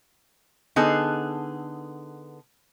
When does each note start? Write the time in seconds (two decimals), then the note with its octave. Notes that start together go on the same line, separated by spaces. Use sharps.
0.76 D3 B3 D#4 G#4 A4